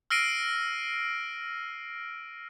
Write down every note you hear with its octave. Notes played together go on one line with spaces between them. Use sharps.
E6 F6 A#6 C7 D7 D#7